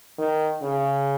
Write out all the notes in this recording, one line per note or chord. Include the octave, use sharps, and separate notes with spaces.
D#3
C#3